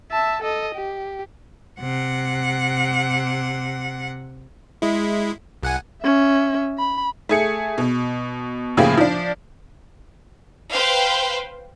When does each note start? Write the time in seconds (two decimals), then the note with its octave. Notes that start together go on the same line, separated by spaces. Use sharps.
0.11 E5 A5
0.43 A4 D#5
0.75 G4
1.80 C3 F#5
4.82 G#3 E4
5.63 C2 F#5 G#5
6.02 C#4 E5
6.78 B5
7.29 A3 G#4 C#7
7.78 B2
8.77 A2 C#3 F3 A#3 G4 G#4
8.97 F3 D4
10.72 B4 C5 F5 G5